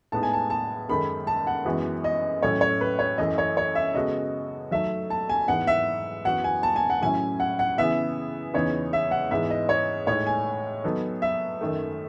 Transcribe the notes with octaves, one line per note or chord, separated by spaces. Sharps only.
A2 G#3 B3 D#4 A5
G#5
A5
A5
F#2 D#3 G#3 D#4 A4 B5
A5
F#5
F#2 E3 G#3 B3 F#4
D#5
A2 F#3 A3 C#4 C#5
C#5
B4
C#5
F#2 E3 A3 D#5
C#5
C#5
E5
C#3 G#3 B3 F#4 A4 D#5
F#3 A3 D#4 A4 E5
A5
G#5
G#2 E3 B3 F#5
E5
F#2 E3 B3 F#4 F#5
G#5
A5
G#5
F#5
A2 F#3 C#4 E4 G#5
F#5
F#5
C#3 E3 B3 E4 G#4 E5
E2 C#3 E3 B3 D#4 C#5
E5
F#5
G#2 E3 G#3 B3 E5
D#5
C#5
A2 G#3 D#4 C#5
G#5
F#3 B3 D#4 A4
E5
F#2 D#3 A3